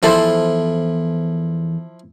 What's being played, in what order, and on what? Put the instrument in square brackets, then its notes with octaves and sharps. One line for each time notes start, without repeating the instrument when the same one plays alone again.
[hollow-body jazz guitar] E2 A4 C5 [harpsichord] F3 E4